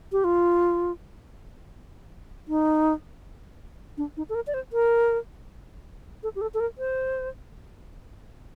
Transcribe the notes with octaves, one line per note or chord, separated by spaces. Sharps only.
G4
F4
D#4
D4
D#4
A4
A#4
D5
C5
A#4
A4
G4
A4
A4
A#4
C5